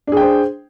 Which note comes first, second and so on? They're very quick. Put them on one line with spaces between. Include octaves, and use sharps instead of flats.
D4 G#4 G5 C5